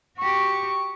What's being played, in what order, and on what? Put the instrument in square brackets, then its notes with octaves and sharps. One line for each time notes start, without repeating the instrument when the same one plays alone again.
[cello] F#4 G4 [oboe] C#6